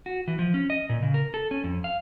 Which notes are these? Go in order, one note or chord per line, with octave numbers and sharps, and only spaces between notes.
F#4
E3
F3
C#4
D#5
A#2
C#3
A#4
A4
C#4
F2
F5